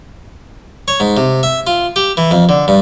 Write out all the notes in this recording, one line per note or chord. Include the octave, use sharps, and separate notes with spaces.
C#5
G#2
C3
E5
F4
G4
E3
F2
D3
G2